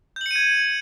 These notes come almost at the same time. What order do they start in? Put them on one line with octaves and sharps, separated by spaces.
G6 F#7 C#7 D#7 G#6